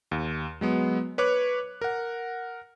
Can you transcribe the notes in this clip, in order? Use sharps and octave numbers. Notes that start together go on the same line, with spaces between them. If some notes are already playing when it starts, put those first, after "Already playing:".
D#2
F#3 G#3 B3
B4 C#5 D6 F#6
A#4 F#5